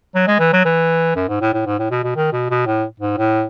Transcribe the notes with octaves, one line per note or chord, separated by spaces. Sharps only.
F#3
G#3
E3
F#3
E3
F#2
G#2
A2
A2
G#2
A2
B2
B2
D#3
B2
B2
A2
G#2
A2